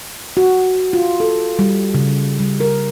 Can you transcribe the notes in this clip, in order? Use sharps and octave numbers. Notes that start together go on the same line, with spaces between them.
F#4
F4
A4
G3
C#3
G3
A#4